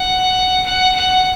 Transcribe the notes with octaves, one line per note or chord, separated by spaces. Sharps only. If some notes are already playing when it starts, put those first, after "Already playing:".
Already playing: F#5
F#5
F#5